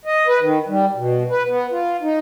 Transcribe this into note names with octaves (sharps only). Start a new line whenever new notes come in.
D#5
B4
D#3
G3
B2
B4
B3
F4
D#4